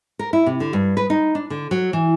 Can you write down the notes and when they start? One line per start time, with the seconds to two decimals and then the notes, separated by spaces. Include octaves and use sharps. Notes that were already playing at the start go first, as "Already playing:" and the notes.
0.19 A#4
0.33 E4
0.46 C3
0.60 D3
0.73 G2
0.97 B4
1.10 D#4
1.35 D4
1.50 D3
1.71 F#3
1.93 E3